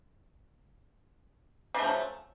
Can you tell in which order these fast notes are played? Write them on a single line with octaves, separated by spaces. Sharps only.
C#3 A3 F3 F#3